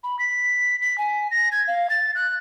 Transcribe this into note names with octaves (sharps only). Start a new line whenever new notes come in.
B5
B6
B6
G#5
A#6
G#6
F5
A6
F#6